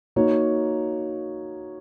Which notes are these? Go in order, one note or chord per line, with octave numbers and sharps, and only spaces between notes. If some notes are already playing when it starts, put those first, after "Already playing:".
A#3 D#4 F#4 C#5